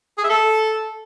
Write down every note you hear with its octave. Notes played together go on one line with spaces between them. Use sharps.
G#4
E5
A4